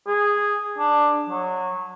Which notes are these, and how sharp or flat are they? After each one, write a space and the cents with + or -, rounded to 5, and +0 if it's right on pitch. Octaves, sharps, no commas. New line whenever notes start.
G#4 -10
D4 +10
F#3 -15